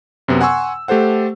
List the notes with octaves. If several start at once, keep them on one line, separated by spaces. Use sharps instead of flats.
F#2 C3 B3
F#5 G#5 C6 C#6 E6
A3 G4 A4 C5 F#5